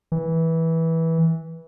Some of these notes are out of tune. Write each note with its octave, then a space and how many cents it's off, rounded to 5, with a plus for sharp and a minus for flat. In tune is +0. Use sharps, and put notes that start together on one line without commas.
E3 -15